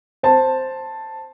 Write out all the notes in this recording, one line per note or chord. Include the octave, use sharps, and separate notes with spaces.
C5 A5